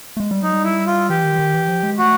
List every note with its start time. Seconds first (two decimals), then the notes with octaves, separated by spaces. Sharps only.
0.17 A3
0.20 G#3
0.31 G3
0.43 F#3 D#4
0.53 G3
0.64 E4
0.87 F4
1.10 E3 G4
1.24 D#3
1.35 E3
1.39 D#3
1.54 E3
1.68 F3
1.83 G#3
1.99 A3 F#4